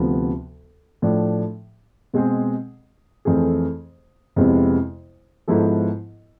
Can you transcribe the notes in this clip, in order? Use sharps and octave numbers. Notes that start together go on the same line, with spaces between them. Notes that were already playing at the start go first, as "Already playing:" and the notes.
Already playing: D2 C3 F3 B3
A2 F3 A3 D4
B2 G#3 C4 G#4
F2 E3 A3 C4 G#4
F2 C3 G#3 B3 E4
G#2 F3 B3 E4 A4